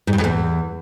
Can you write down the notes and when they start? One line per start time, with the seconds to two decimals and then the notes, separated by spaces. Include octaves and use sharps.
0.07 G#2
0.13 G2
0.18 F2
0.24 E2